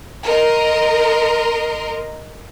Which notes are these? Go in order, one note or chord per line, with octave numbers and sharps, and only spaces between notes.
A#4 D#5 C6